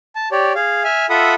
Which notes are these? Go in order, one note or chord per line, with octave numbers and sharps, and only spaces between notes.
A5
G4 C#5 D5
G#4 F5
E5 G#5 F6
F4 A4 E5 F#5 B5 D#6